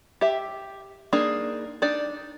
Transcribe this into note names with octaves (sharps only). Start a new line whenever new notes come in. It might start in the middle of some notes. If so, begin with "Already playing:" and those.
G4 E5
A#3 D4 D#4 G#4
D4 D#4 D5